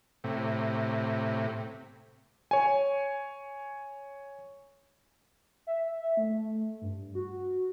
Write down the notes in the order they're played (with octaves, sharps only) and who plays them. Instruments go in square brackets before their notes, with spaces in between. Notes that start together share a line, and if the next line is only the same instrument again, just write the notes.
[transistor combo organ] A2 C3
[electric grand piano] C#5 G#5
[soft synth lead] E5
A3
G2
F#4